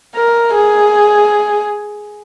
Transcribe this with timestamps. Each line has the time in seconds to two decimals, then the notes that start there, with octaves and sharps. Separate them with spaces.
0.15 A#4
0.54 G#4